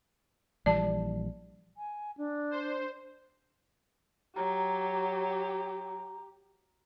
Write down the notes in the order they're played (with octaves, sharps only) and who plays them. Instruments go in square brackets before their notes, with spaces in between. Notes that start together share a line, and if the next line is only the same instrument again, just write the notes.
[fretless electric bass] A#1 E3 G3 [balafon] D5 A5
[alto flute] G#5
D4
[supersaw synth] C5
[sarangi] F#3 [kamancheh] G4 [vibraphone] A#5